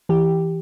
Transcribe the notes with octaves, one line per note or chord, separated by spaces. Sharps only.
E3 G4